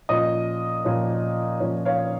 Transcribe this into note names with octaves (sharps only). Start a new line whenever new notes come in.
A#2 F3 C#4 D#5
A#2 F3 C#4
A#2 F3 C#4
C#5 F5